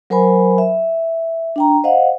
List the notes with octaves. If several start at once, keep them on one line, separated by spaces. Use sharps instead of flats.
F#3 A#4 C5 G#5 B5
E5
D4 G5 A#5
C5 D#5 F5 F#5